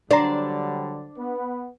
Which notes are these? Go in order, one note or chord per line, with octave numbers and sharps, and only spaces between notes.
D3 F#3 G3 D4 C5 D5 A#5
B3 B4